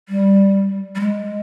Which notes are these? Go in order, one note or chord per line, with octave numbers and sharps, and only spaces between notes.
G3
G3
G#3